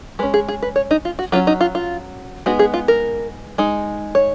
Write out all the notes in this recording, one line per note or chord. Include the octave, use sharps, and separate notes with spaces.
G#3 C#4 B4
G#4
G#4
B4
C#5
D#4
F4
F#4
F#3 C#4 F4
D#4
F4
F4
G#3 B3 D#4 F#4
G#4
F4
A#4
G#3 D#4
C#5